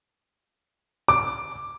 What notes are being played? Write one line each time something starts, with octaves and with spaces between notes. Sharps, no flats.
D6